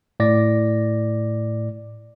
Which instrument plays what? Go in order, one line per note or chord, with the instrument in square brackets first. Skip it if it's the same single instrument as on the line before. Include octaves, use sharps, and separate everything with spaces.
[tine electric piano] A2 D5 A#6